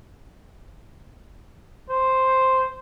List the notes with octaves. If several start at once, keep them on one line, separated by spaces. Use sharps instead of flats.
C5